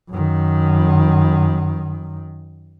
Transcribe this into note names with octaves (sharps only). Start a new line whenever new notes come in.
F#2 D#3